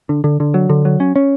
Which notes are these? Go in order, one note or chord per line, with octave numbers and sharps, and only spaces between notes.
D3
D3
D3
F#3
D3
F#3
C#4
C#4